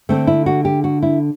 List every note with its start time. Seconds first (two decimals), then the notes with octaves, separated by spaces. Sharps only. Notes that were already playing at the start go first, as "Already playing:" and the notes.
0.09 D3 A3 C4
0.27 E4
0.46 F#4
0.65 G4
0.84 F#4
1.03 E4